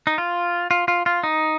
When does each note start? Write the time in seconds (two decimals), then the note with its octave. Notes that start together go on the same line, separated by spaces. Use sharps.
0.07 D#4
0.18 F4
0.71 F4
0.88 F4
1.06 F4
1.23 D#4